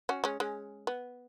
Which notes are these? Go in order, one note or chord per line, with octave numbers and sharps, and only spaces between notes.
C#4 F#4
G#3 C#4
G#3 C#4
B3